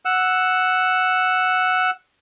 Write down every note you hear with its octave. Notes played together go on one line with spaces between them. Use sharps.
F#5 E6